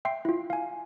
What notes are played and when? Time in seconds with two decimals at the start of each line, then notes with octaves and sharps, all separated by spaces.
0.05 E5 G5 C6 C7
0.25 E4 F4
0.50 F5 G#5